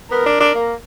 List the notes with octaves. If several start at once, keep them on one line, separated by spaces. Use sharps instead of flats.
B3 A#4
D4
D4
A#3